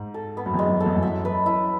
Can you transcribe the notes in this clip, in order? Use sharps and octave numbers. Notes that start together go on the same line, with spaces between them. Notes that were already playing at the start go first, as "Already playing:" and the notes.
Already playing: G#2
A4
B3
F#2
E2 G#3
F#2
A4
E2
E2
F#2 E5
B4
E4